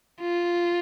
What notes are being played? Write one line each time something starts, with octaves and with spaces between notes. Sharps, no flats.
F4